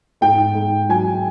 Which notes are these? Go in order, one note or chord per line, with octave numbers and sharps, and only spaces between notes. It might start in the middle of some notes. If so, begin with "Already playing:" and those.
G#2 G5
G#2
F#3 G#5